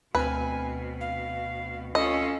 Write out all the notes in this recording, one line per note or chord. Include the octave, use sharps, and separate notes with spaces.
D2 B2 C4 B4 G#5 F6
F5
C#4 F4 A4 D#5